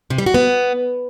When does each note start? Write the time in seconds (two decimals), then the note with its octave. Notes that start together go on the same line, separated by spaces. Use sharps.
0.10 C3
0.18 G3
0.26 F#4
0.34 B3